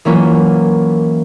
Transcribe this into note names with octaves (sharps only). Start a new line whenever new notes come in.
E3 F#3 A#3 C#4 E4 F4